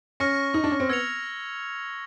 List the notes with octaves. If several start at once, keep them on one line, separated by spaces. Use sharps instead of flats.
C#4 C#6 F6 A#6 C#7
D#4
D4
C#4
C4
B3 E6 G#6 C#7 F7